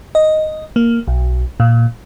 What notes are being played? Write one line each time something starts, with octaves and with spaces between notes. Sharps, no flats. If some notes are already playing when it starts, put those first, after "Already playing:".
D#5
A#3
B1
A#2